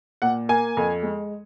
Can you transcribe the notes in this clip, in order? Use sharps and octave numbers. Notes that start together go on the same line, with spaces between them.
A#2 F#5
A#3 G#5
F2
G#3